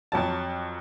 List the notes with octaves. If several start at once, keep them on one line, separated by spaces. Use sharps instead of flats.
F2 F#3 A5